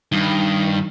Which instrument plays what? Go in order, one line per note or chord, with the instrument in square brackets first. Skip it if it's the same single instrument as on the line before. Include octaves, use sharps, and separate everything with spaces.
[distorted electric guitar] G2 [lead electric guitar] D#3